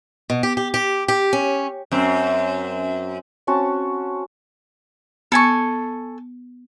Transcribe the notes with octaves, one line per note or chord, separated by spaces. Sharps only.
B2
G4
G4
G4
G4
C#4
F#2 C4
C4 C#4 F#4 A5
B3 A4 G#5 C#6